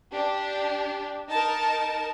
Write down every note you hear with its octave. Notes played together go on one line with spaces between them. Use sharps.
D4 G4
D#4 A#4 A5